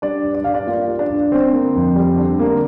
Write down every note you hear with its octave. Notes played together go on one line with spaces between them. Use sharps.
G3 D4 D5
G2
D5
G2 F5
D4 D5
A#3 F4 F5
G3
D4 D5
G2
D3 C4 C5
A#3
F2
G3
D3
A#3